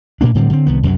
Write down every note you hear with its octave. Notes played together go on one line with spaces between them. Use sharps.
A#2 A#3 D4
A2 D3 G3 C4
D3 C4
C2 D#3 B3
C2 F#2 F#3